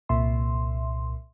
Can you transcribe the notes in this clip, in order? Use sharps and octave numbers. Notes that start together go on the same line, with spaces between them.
C2 A#2 E5 C6